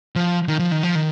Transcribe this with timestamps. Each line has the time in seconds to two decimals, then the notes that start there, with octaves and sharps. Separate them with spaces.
0.16 F3
0.48 D#3
0.59 F3
0.72 D#3
0.83 F3
0.95 D#3